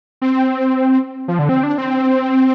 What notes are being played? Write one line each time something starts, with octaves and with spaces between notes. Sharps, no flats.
C4
F3
D3
C4
D4
C4